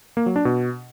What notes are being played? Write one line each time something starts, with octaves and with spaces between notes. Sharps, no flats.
A#3
F#3
D4
B2